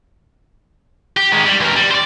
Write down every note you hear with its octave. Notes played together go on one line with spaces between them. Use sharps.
G4
D#3 G#3
G3
C#2 A#4
G3
C5 D5